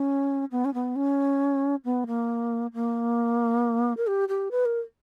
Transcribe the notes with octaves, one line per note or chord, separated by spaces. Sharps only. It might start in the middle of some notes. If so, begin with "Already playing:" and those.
Already playing: C#4
B3
C#4
B3
C#4
B3
A#3
A#3
A#4
G4
G4
B4
A#4